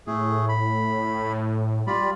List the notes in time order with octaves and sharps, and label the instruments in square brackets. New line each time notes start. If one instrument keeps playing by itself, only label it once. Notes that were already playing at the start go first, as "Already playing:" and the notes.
[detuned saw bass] A2 [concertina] A3 G#4
[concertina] B5
[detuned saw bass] G3 [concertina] F4 D5 B5